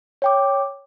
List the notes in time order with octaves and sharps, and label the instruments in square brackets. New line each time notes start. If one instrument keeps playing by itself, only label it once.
[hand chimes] C#5 G5 D6